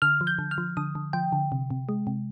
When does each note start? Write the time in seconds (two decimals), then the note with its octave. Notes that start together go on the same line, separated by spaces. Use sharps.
0.02 D3 F6
0.21 F3
0.27 G6
0.39 D3
0.51 F6
0.58 F3
0.77 D3 D#6
0.95 D3
1.13 F3 G5
1.32 D3
1.52 C3
1.70 C3
1.89 G#3
2.07 C3